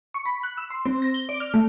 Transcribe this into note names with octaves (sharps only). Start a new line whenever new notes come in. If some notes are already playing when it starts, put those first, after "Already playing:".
C#6
B5
F#6
E6
C6
C4
A#6
G7
D5
F6
A3